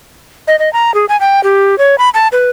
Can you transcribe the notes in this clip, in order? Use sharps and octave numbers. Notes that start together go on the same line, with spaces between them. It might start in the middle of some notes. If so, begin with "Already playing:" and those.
D#5
D#5
A#5
G#4
G#5
G5
G4
C#5
B5
A5
B4